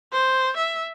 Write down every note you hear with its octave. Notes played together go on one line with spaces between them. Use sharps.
C5
E5